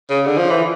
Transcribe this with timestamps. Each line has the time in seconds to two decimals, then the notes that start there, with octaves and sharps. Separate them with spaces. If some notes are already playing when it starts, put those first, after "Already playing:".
0.10 C#3
0.26 D3
0.38 F3
0.50 E3